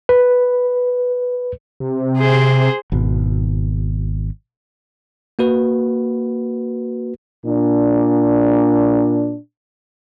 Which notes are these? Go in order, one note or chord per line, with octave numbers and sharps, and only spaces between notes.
B4
C3
G#4 C5
G#1 B2
A#3 F#4 B4
A#2 D4